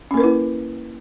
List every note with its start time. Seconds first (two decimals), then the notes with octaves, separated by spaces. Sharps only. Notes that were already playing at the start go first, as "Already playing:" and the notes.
0.11 C#4
0.14 A#3
0.17 A#4
0.20 B4
0.24 E4